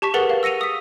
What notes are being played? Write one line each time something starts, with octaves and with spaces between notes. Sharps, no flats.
G4 A5 C#6 B6
G#4 A#4 B4 F#5 A6 G7
F5
E6 A#6 C#7 D#7 F7
D#6 B6